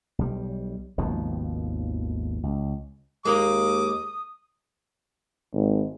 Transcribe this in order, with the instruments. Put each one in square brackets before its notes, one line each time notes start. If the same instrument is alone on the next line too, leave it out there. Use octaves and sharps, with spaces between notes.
[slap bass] B1 G3
G#1 D#2 B2 F3
C#2
[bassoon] D#2 [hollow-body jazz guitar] G#3 A#3 A#4 [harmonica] D6 [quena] D#6
[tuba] G#1